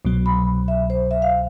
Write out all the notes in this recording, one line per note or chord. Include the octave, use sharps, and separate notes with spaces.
C2 B2 F#3
B5
E5
C5
E5
F5